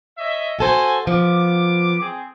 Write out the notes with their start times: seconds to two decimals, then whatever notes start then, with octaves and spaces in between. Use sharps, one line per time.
0.17 C#5 D#5 E5
0.59 F#4 A4 C5 G#5
1.07 F3 B3 D6
2.01 C4 G#4